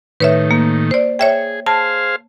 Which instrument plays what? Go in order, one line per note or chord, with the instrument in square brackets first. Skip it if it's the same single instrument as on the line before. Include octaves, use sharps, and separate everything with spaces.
[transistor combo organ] A2 D#3 [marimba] B4 C#5 E5
[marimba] A#3
C5 D5
[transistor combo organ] G#4 [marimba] C#5 E5 G5
[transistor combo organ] G#4 C5 F5 [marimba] A5